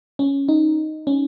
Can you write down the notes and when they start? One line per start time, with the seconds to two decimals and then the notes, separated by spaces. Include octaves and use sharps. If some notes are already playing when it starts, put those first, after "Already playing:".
0.19 C#4
0.48 D#4
1.07 C#4